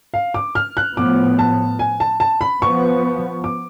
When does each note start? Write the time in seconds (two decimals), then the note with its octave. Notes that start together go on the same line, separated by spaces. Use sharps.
0.14 F5
0.34 D6
0.55 F6
0.77 F#6
0.97 A2 F3 B3 D6
1.39 A5
1.79 G#5
2.00 A5
2.20 A5
2.41 B5
2.62 F3 B3 C#6
3.44 D6